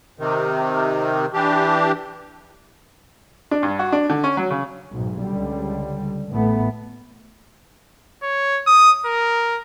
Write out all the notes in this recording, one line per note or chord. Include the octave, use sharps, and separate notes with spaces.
C3 D#3
E3 D4 G4
D4
G2
F#4
D4
D3
C#4
F#3
C#3
B1 G#2
C#2 D3 G3
A1 A2 A3 B3
C#5
D#6
A#4